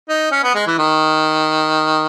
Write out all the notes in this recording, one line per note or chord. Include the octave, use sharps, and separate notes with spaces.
D#4
C#4
B3
G#3
E3
D#3